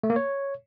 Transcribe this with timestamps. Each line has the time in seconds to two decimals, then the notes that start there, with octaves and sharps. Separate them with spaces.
0.03 A3
0.10 A#3
0.16 C#5